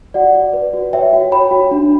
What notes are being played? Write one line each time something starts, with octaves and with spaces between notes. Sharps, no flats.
F#4 D5 F#5
D5
B4
F#4
C#5 E5 G5
F#4
C#5 G5 B5
F#4
D4